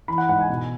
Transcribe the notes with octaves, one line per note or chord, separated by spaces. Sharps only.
E3 B5
F#5
G#2 F#5
G#5
B2